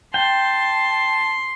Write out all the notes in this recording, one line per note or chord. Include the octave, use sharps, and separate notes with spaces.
G5 A5 C6